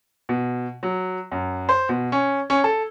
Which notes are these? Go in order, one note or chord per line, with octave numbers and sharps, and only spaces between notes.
B2
F#3
F#2
C5
B2
C#4
C#4
A4